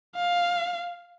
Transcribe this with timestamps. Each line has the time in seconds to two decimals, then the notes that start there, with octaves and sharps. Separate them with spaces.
0.15 F5